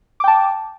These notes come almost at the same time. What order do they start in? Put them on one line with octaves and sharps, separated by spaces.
D6 G5 A5